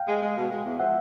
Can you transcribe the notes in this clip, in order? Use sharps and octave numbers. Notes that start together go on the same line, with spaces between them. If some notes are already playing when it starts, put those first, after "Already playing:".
Already playing: F5 G5
G#3
G#3
B2
G#3
E2
F3 E5 F#5